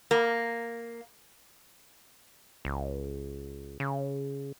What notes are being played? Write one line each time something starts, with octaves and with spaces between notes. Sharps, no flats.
A#3
C#2
C#3